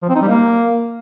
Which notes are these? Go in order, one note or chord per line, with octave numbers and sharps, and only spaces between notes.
F3
C4
D#4
G3
A#3